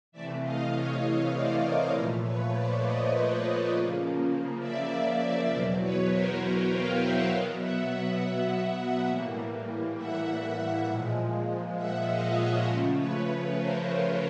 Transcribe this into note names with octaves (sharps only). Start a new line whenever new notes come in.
C3 E3 A3 D5 E5
D#5 F5
C#5 D#5
C#5 D#5
C5 D5
A#4 C5
A#2 F3 A3 A4 B4
B4 C#5
C5 D5
C#5 D#5
C#3 F3 A#3
D5 E5
E2 B2 F#3 C5 D5
B4 C#5
A#4 C5
B4 C#5
F5 G5
E5 F#5
B2 F#3 B3 D#5 F5
E5 F#5
E5 F#5
A2 E3 G3 A#3
E5 F#5
A#2 F3 G#3
E5 F#5
D#5 F5
C#5 D#5
C#3 F3 A3 C5 D5
B4 C#5
B4 C#5
A#4 C5
B4 C#5